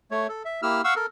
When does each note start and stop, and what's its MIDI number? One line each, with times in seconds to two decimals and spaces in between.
0.11 0.27 57
0.11 0.27 73
0.29 0.43 69
0.45 0.61 76
0.63 0.82 58
0.63 0.82 64
0.63 0.82 67
0.63 0.82 88
0.63 0.82 89
0.84 0.94 77
0.84 0.94 78
0.84 0.94 85
0.84 0.94 88
0.96 1.06 69
0.96 1.06 70